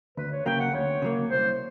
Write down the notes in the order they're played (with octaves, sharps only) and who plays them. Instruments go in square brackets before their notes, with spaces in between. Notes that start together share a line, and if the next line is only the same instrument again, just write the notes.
[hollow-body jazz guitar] D2 [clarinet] B4
[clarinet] C#5
[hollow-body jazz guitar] C#3 F#3 A#3 [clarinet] G5
[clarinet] F#5
[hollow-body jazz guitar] D2 [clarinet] C#5
[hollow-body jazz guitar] C#3 F#3 A#3
[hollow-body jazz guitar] C2 [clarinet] C5